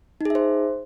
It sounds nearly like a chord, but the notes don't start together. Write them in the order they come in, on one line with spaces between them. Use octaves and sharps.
D#4 G#4 E5 C5